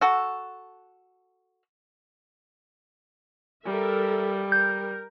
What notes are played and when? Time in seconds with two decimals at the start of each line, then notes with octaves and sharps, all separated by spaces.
0.01 F#4 A4
3.65 G3 A4 A#4 E5
4.52 A#4 G6